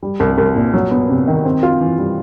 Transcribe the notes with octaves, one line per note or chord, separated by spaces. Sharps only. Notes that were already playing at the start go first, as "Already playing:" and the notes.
G3
C2
C2
A#2
F#3
B3
C3
D#3
C4
F4
E3
G3